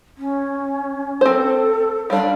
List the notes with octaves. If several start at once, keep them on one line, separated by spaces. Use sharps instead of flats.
C#4
C4 A4 C5
G3 D4 F5